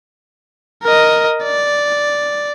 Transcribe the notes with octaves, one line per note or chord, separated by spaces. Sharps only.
A#4 D#5
D5